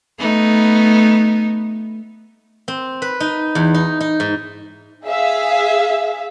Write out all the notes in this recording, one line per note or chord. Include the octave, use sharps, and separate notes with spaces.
A3 B3 D#4
C4
B4
D#4
E2
D#4
D#4
G#2
G#4 E5 F5